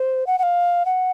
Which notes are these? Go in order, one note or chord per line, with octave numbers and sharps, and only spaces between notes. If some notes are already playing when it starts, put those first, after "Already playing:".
Already playing: C5
F#5
F#5
F5
F#5